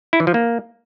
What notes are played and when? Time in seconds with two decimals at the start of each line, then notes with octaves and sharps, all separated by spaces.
0.13 E4
0.20 E3
0.27 F3
0.34 A#3